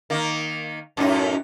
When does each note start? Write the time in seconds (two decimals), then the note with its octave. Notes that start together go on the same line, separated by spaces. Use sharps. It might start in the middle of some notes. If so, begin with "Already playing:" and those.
0.10 D#3 A#3
0.97 F#2 A2 D#4